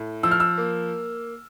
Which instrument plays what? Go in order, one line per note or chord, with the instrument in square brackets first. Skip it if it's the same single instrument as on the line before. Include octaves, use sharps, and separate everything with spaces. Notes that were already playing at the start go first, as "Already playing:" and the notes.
Already playing: [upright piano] A2
F3 E6
F6
E6
A#3